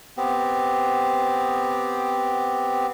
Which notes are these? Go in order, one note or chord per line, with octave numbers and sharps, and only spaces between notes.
B3 C4 G4